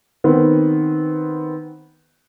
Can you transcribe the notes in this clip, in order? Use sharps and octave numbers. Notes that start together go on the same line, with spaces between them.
D#3 B3 C4